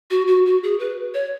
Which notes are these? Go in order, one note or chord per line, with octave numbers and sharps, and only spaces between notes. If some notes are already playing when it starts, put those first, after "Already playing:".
F#4
F#4
F#4
G#4
B4
C#5